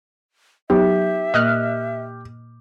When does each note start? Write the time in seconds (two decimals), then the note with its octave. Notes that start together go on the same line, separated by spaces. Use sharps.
0.70 F#3 B3 D#4 G4 E5
1.34 A#2 A#3 D#5 F6 F#6